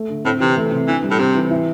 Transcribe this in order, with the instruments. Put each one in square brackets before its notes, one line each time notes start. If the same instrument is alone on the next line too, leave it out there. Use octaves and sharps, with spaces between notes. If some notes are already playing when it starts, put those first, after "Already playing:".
Already playing: [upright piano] A3
D3
[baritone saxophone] A2 [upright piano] C4
[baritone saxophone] C3 [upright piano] E3
[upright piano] A3
C3
[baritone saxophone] E3 [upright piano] D4
[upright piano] G3
[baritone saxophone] A2
[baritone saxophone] C3 [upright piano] C4
[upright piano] E3
E4